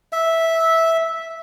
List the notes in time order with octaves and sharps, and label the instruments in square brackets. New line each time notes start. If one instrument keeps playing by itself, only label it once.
[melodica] E5